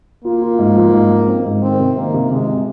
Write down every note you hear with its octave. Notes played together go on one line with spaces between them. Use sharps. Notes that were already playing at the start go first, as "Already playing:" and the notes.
A#3 F4
F4
G#2
F3
G#2
F3
C4
G#2
D#3 C4
C3
D#3 A#3
C3
C3 G#3
C3